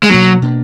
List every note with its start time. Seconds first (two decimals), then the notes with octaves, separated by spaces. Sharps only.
0.03 G#3
0.09 B2 F#3 A#3 D4
0.42 B2 A#3 D4